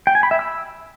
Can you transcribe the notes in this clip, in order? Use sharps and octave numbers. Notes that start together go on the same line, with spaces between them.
G5
G#5
B5
E5
E6